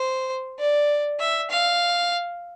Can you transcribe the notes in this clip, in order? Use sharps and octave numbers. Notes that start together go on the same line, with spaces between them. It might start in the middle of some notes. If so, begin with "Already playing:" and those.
Already playing: C5
D5
E5
F5